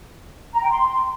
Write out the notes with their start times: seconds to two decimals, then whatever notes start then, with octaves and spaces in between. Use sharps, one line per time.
0.54 A#5
0.62 G5
0.70 C6